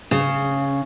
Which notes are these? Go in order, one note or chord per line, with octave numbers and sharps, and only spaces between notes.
C#3